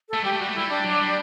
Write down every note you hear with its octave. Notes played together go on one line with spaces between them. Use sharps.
A3 A4
G3 G4
A3
G3 F#4
A3
G3 E4
D4
F#3
G3